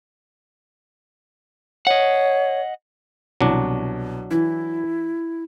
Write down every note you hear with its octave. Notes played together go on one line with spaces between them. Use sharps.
C#5 D#5 F#5
C2 B2 E3 F#3 D4
E3 E4